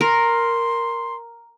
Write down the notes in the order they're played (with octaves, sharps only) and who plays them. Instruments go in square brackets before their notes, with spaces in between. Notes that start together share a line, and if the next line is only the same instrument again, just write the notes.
[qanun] A#4 [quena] C6